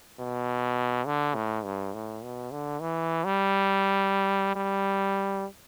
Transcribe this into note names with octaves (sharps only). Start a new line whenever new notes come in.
B2
D3
A2
G2
A2
B2
D3
E3
G3
G3